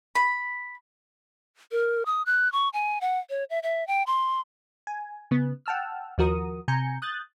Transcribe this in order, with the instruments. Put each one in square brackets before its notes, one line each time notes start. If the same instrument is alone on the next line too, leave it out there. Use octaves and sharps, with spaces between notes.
[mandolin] B5
[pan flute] A#4
D#6
F#6
C#6
G#5
F#5
C#5
E5
E5
G5
C6
[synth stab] G#5
C#3 B3
F#5 G5 A5 E6 F6
D#2 F3 F#4 A#4 D#6
C3 G#5 A#5 G6 C#7
D#6 F#6 G6 A6